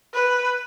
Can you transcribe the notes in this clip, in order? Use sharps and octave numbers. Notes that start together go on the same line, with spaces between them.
B4